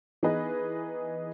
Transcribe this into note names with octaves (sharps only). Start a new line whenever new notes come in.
E3 B3 D#4 G#4 B4 D#5